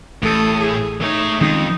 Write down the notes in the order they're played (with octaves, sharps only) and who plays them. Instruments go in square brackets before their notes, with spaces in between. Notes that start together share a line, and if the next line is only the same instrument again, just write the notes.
[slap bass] A1 [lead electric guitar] A2 [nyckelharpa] A4 D#6
[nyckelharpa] G#4
[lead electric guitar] A3 C#5 [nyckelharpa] D#4
[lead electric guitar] F2 [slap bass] D#3 G#3 C#4 [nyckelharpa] D#4